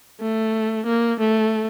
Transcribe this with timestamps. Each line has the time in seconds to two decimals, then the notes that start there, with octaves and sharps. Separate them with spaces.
0.21 A3
0.86 A#3
1.20 A3